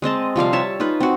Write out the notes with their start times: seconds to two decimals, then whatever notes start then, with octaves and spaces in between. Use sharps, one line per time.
0.02 G#3 C4 D#5 A5
0.36 C3 F3 G3 F5
0.53 C#5 E5 A5
0.80 D#4 F4 B4
1.00 C4 F#4